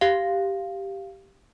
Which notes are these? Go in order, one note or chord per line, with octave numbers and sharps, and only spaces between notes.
G4 F5